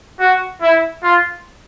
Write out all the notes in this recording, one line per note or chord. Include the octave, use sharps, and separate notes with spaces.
F#4
E4
F4